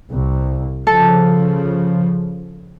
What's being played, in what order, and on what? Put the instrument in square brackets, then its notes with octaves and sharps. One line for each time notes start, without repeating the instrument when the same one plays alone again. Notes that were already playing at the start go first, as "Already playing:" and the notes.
[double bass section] C2
[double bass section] C#3 F3 [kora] A4